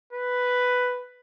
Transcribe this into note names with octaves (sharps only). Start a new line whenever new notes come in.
B4